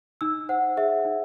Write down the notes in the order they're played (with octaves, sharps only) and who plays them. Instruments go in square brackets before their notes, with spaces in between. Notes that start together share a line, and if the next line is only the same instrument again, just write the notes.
[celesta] D#4 E6
C5 F#5
G#4 E5
D#4